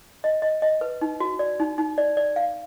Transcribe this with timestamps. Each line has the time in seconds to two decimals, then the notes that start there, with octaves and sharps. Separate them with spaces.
0.24 D#5
0.42 D#5
0.62 D#5
0.81 B4
1.01 D#4
1.20 F#4
1.39 D5
1.60 D#4
1.78 D#4
1.98 D5
2.17 D5
2.36 F5